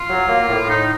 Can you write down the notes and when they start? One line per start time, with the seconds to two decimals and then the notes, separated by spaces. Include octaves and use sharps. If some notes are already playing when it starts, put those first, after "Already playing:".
Already playing: F4
0.09 F#3
0.28 A#3
0.48 A2
0.68 D#4